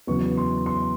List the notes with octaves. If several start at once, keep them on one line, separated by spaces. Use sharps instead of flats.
E2 C#3 F#3 B3 C#6
C6
C6